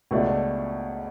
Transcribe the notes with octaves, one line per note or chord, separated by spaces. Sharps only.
C#2 B2 A3 D4